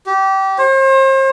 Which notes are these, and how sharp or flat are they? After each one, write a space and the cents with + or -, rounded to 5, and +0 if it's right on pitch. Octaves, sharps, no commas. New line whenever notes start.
G4 -25
C5 +40